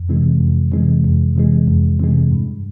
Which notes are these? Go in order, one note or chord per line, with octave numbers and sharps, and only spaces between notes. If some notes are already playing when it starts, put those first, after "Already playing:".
Already playing: F2
C3 E3 G#3
F2
C3 E3 G#3
F2
C3 E3 G#3
F2
C3 E3 G#3
G2